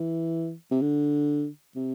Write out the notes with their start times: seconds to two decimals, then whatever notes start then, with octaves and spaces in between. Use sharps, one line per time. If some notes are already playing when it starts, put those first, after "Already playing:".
Already playing: E3
0.71 C3
0.82 D3
1.76 C3